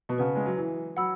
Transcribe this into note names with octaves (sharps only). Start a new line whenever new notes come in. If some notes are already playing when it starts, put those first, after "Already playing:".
B2
C#3 B4 F#5 A5 C#6
G#3
F#3
E3
F#3 F#5 B5 E6